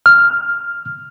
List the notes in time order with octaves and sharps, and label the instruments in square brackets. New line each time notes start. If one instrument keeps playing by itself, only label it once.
[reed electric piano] F6